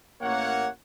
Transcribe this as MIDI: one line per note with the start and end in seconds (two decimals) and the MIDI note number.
0.21 0.68 33
0.21 0.68 58
0.21 0.68 73
0.21 0.68 78